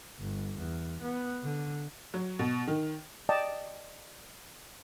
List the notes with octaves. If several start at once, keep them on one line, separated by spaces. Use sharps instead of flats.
G1
E2
B3
D3
F#3
B2
D#3
D5 D#5 G5 A5